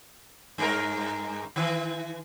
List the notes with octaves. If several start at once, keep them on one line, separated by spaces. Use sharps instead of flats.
G2 G#3 A#4
D#3 E3